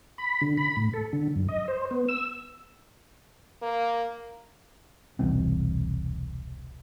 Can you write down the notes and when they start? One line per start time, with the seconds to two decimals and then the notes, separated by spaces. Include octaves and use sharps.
0.18 B5
0.41 D3
0.57 B5
0.77 A2
0.93 A4
1.13 D3
1.36 F#2
1.49 D#5
1.68 C5
1.91 B3
2.08 E6
3.62 A#3
5.19 E1 C2 E3 C4